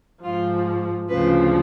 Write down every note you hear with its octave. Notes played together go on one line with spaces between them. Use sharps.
G#2 F3 F4
D2 C#3 F3 B4